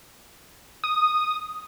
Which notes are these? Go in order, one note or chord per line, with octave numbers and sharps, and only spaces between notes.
D#6